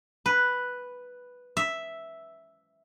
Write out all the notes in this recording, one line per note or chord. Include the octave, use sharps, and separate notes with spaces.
B4
E5